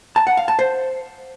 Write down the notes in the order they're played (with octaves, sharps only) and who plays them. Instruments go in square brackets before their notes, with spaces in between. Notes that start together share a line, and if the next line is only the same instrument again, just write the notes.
[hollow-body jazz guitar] A5
F#5
F5
A5
C5